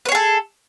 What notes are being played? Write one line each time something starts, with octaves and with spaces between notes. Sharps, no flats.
G#4 A4 B4 C#5